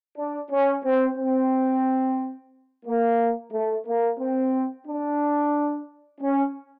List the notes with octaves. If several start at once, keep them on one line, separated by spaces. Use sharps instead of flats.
D4
C#4
C4
C4
A#3
A3
A#3
C4
D4
C#4